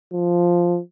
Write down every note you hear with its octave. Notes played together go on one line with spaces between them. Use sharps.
F3